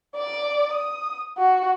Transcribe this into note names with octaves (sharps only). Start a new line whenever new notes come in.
D5 D6
D#6
F#4